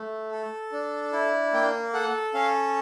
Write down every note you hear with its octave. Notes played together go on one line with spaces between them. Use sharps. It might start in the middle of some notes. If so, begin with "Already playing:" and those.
Already playing: A3
A4
D4
E4
A#3 G5
A4 F#5
C#4 F5